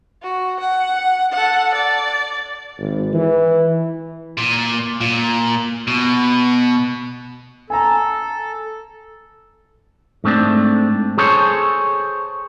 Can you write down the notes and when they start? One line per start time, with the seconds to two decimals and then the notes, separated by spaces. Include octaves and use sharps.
0.22 F#4
0.60 F#5
1.32 A4 F#5
1.74 D5
2.79 G#1
3.13 E3
4.37 A#2
5.01 A#2
5.87 B2
7.70 A4 G#5 A#5
10.24 G#2 A3 C4 D4
11.18 G#4 A4 C5 C#5